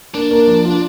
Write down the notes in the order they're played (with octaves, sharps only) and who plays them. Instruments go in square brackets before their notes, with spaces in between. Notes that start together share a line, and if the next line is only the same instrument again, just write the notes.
[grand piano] A#3 [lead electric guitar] D4
[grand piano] A#3
F3
F4